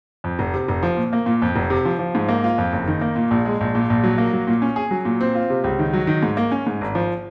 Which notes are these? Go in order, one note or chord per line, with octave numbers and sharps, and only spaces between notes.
F2
F1
C3
F1
F3
A#2
A#3
A#2
F2
F1
C3
F3
F3
G#2
A#3
F4
F2
F#1
D#3
A#3
A#2
A#1
G#3
A#1
A#2
A#1
F#3
A#3
F#3
A#2
C#4
G#4
F#3
A#2
C4
F4
C3
C#2
D#3
F#3
D#3
G#2
A#3
C#4
G#2
G#1
F3